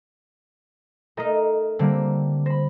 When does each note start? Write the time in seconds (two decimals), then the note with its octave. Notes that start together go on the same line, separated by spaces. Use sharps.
1.17 A3 D#4 A#4 D#5 A#5
1.79 D3 G3 A#3 C4
2.46 C5 B5 A#6